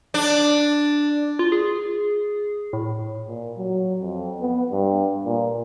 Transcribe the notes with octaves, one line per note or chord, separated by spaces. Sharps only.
D4
F4
G#4
A2
A#2
F#3
F2
B3
G2
A#2